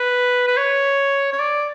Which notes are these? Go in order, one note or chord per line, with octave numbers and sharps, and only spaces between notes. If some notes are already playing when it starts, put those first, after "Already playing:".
Already playing: B4
B4
C#5
C#5
D5